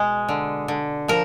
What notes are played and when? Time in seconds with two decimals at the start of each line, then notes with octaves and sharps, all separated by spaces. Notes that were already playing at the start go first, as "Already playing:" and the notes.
Already playing: B2 G#3
0.29 D3
0.68 D3
1.08 F3 A#4